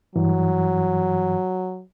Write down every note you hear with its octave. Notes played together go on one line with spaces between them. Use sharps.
G2 E3 F#3